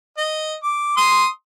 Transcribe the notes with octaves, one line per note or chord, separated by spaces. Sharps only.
D#5
D6
C6 D#6